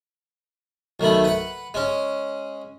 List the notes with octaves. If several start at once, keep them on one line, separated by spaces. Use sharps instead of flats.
B1 D#3 A3 B5
B4 F#5
G#3 C#4